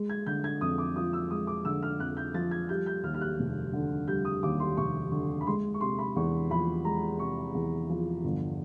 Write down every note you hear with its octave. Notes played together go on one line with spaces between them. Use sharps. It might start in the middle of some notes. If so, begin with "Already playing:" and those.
Already playing: G#3
G#6
D3 G6
G#6
F2 D#6
D6
F3 D#6
E6
G#3 D#6
D6
D3 E6
F6
F2 F#6
G6
F3 A6
G#6
G3 G6
G6
D#2 F6
F6
F#6
F1
D3
G3 G6
D#6
D#2 D6
C6
F1 C#6
D3 C#6
B5
G#3 C6
C#6
C3 C6
B5
E2 C#6
F3 B5
G#3 A#5
C3 C#6
E2
F3
G1